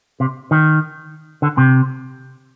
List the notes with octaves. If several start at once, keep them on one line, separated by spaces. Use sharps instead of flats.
C3
D#3
D3
C3